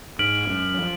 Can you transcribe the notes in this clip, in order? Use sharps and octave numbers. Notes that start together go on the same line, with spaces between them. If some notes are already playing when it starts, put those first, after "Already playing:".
G#2 G#3 F6 B6 D7 F#7
F#2 F#3
F3